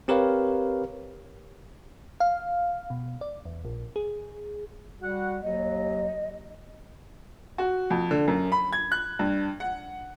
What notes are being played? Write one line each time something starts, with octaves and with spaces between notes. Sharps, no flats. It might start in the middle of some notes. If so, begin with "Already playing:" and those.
C4 G4 A#4 B4 C#5 F5
F5
B2
D5
E2
A#1
G#4
G3 F#4 F#5
D#2 F#3 D#5
F#4
F2
D3
F#2
B5
G#6
F#6
G2
F#5